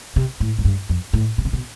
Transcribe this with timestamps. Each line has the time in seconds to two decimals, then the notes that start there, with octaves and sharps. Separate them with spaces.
0.16 C3
0.40 A2
0.59 A2
0.65 G2
0.89 F2
1.13 A2
1.38 B2
1.45 C3
1.53 B2